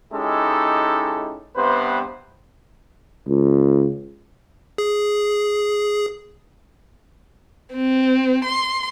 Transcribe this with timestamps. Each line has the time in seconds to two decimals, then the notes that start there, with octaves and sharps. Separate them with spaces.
0.13 G#3 C#4 D#4 E4 G4 A4
1.56 G2 C3 B3 B4 C5
3.28 C#2
4.78 G#4
7.75 C4
8.45 C6